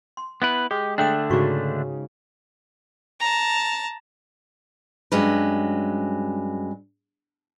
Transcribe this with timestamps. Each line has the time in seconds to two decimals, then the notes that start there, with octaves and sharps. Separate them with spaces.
0.17 C6
0.42 B3 E4 B4
0.71 G#3 G4
0.98 D3 A3 D4 G5 D#6
1.30 G#2 C#3 F#4 C#6 D6
3.20 A5 A#5
5.12 G2 F#3 G#3 C#4 B4